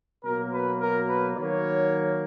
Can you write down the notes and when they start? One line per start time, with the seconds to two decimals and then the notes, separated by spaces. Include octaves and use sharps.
0.24 B2 F#3 A#3 A#4
0.53 B4
0.81 A#4
1.09 B4
1.37 D#3 F#3 A#3 C#5